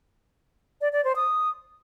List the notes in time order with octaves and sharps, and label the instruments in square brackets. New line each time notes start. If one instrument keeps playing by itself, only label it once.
[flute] D5
D5
C5
D#6